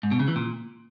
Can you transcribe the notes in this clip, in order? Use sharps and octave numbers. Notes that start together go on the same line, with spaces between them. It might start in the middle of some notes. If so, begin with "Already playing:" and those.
G#2
B2
C#3
E3
A#2